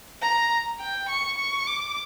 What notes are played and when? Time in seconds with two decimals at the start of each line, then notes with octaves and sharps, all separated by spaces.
0.22 A#5
0.80 G5
1.09 C#6
1.38 C#6
1.67 D6